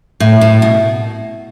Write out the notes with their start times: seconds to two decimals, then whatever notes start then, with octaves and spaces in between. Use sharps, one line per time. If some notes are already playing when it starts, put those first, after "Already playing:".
0.20 A2
0.41 A2
0.62 B2